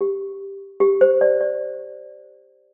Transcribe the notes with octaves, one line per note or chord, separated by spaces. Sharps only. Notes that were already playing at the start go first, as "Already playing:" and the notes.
G4
G4
C5
D5
D5